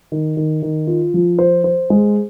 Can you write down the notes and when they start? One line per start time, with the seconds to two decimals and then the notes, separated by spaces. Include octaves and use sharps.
0.12 D#3
0.37 D#3
0.62 D#3
0.87 F4
1.14 F3
1.39 C5
1.64 C5
1.90 G#3